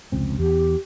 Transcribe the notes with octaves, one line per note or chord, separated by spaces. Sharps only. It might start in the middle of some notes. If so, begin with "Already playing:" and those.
F1 C#2 C4
E2 G4